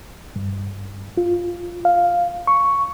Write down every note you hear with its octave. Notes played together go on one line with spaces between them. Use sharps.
G2
F4
F5
C#6